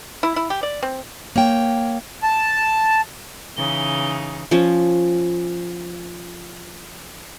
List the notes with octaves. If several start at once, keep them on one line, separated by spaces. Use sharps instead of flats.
E4
E4
G4
D5
C4
A#3 C#5 G5
A5
C#3 E3 D#4 G7
F3 C#4